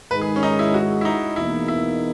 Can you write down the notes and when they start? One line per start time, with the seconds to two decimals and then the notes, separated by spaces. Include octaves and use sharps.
0.11 G#2 D#3 G#3 B4
0.21 G#4
0.36 C#4
0.43 D#4
0.59 E4
0.74 F#4
1.01 E4
1.05 D#4
1.36 E2 B2 A#3 D#4 E4
1.68 E4